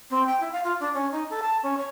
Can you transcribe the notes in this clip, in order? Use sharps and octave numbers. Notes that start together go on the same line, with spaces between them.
C4
G5
E4
F5
F4
D4
C#4
D#4
A4
A5
C#4
C#5